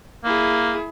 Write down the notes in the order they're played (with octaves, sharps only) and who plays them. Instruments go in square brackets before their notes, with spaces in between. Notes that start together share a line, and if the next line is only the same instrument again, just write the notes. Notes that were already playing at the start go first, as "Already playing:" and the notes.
[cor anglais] A#3 [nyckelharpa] E4 G#4